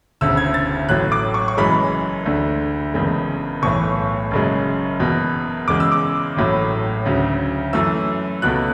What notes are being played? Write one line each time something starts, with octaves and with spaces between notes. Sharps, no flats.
E1 D2 C#3 E6
G#6
A6
A1 A2 F#3 A3 F#6
D6
C#6
C#6
F#1 F#2 E3 G#3 B5
D2 D3 A3
F#1 E2 C#3 G#3
B1 A2 E3 C#6
F#1 F#2 C#3 G#3
F#1 E2 B2
E2 C#3 G#3 D6
E6
D6
A1 A2 F#3 A3
D2 C#3 F#3
F#2 E3 A3 E6
C#2 B2 A3 F#6